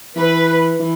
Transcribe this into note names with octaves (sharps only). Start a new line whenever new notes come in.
E3 B4
E3